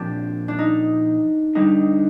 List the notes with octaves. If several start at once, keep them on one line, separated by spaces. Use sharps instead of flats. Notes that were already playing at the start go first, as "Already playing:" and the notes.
Already playing: A#2 F3 C4 D4 G4
D4
D#4
D3 G3 D4 D#4